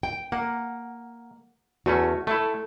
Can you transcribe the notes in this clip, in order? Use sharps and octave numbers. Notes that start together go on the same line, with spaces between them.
G5
A#3 F#5
E2 A3 C#4 F#4
A3 E4 A4